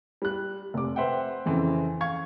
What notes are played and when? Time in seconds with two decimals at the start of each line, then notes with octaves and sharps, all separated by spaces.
0.22 G3 F#6
0.74 F1 D6
0.96 B4 C5 E5 F#5 G5
1.46 F2 C#3 E3 C4
2.01 F5 C#6 G#6